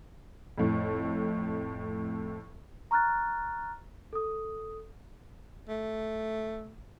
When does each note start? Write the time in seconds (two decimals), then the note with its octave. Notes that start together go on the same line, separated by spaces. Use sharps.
0.58 F2 A2
2.91 A#5 C#6 F6 F#6 A6
4.13 A4 D#6
5.69 A3